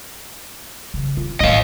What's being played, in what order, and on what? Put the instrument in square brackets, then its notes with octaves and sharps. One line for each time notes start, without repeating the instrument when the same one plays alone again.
[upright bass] C#3
F4
[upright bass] A1 E3 [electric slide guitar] D#5 F5